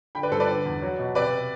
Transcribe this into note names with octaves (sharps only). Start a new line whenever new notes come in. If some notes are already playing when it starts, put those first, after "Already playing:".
D3 G5 B5
B4 D5
G2 A4 C5
B4 D5
D3
E2
F#3
B2
C3 B4 D5